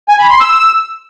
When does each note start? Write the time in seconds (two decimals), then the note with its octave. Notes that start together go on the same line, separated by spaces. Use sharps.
0.08 G#5
0.19 B5
0.30 C6
0.40 E6